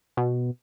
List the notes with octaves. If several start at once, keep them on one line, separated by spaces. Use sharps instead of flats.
B2